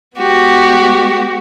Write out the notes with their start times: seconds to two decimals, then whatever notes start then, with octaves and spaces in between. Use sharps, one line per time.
0.18 G#3 B3 F#4 G4